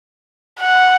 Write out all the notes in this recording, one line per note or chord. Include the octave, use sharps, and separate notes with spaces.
F#5